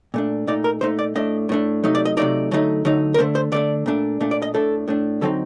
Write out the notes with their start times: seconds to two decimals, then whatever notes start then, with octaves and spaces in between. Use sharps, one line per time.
0.14 A#2 A3 D4
0.47 A#2 A3 D#4 D5
0.64 A#4
0.81 A#2 A3 D#4 C5
0.99 D5
1.16 A2 A3 D4 D#5
1.49 A2 A3 D4
1.84 C3 F#3 A3 D#4
1.95 D5
2.05 D#5
2.17 C3 F#3 A3 D#4 D5
2.51 D3 F#3 A3 D#4
2.85 D3 F#3 A3 D#4
3.14 A#4
3.18 D3 A3 D4 C5
3.35 C5
3.52 D3 A3 D4 D5
3.86 A#2 A3 D4
4.20 A#2 A3 D4
4.31 D5
4.42 D#5
4.54 A2 A3 D4 A4
4.88 A2 A3 D4
5.21 D3 F#3 C4 D#4 A4